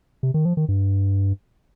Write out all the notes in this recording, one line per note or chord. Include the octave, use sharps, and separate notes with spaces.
C3
D#3
F3
D#3
G2